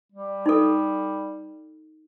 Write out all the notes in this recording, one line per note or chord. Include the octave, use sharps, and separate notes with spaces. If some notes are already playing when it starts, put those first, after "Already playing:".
G3
D#4 A4